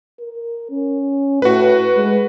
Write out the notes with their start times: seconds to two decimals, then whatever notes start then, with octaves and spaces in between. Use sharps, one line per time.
0.19 A#4
0.70 C#4
1.42 A2 F#4 B4
1.96 G#3